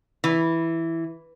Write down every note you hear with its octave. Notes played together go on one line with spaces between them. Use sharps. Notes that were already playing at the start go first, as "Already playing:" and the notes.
E3